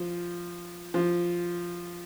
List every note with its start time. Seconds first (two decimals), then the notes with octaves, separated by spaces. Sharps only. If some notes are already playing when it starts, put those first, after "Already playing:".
Already playing: F3
0.94 F3